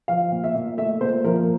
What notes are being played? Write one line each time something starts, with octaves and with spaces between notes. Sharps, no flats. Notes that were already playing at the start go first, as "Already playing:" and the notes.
F3 F5
A#2
E5
A#2
A3 E5
A#2 C5
F3 A#4